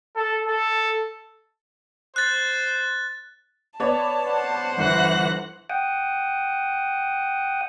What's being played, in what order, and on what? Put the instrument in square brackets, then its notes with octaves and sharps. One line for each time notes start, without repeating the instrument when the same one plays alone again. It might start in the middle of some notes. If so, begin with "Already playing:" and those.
[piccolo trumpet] A4
A4
[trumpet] C5 [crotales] F#6 A6
[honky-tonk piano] B3 C#5 D5 [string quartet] A5
[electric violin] C5 F#5
[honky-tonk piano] G1 [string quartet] E3 F#6 A#6
[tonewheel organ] F#5 G5 D#6